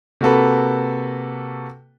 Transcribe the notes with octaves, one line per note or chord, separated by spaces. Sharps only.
C3 A#3 F#4 A4 B4